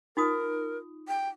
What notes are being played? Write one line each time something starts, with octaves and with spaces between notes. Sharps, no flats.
D#4 F4 A#4 D#6
G5